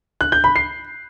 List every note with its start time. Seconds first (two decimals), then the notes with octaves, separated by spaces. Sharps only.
0.21 F#6
0.32 G6
0.44 B5
0.56 C7